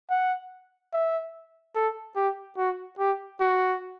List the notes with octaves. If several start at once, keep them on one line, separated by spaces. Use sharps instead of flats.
F#5
E5
A4
G4
F#4
G4
F#4